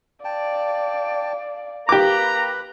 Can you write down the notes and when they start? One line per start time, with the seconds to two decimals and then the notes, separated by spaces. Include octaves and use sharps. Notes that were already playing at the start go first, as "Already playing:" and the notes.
0.25 D5 F5 G5 A5
1.89 A#3 G4 B4 A#5 B5 D6